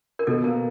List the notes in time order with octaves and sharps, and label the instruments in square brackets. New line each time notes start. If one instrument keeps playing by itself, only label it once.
[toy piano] A#4
[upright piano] B2 [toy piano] A4
[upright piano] A#3 [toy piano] A#4